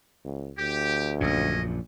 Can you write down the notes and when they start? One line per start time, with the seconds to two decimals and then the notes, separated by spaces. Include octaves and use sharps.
0.25 C#2
0.58 D2 G4
1.21 A#1 F#2 A#2 C#4 D#5